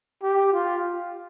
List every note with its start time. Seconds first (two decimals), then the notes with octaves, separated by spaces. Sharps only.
0.23 G4
0.53 F4